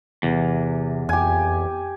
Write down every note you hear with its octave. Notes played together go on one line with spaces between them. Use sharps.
E2 C3
F2 G4 G#5